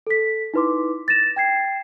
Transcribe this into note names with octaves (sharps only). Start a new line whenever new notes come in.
A4 B6
D#4 E4 B4 C6 D6
A6 A#6 E7
G5 G#6 C7